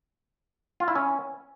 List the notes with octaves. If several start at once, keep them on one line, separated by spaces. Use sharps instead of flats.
F4
E4
C#4